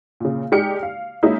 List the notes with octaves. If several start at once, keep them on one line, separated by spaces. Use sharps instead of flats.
A#2 C#3
G#3 D#4 G4 D5 F6 C#7
F5
G#3 A#3 C#4 D#4 E4